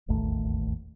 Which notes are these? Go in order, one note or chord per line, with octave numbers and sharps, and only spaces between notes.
E1 A1 D#2 A3